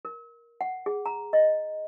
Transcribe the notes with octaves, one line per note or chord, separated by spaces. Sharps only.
A#4
F#5
G#4
A#5
D#5